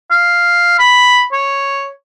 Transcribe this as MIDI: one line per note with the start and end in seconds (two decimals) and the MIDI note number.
0.11 0.79 77
0.79 1.24 83
1.32 1.89 73